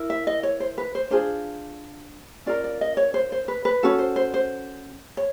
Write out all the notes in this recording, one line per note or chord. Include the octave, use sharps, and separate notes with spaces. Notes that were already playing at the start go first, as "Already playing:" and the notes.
Already playing: E4 A#4
E5
D#5
C#5
C5
B4
C5
D4 F4 G#4 C5
C#4 F4 A#4 D5
D5
D#5
C#5
C5
C5
B4
B4
C#4 F#4 A4
C5
C5
C5
C#5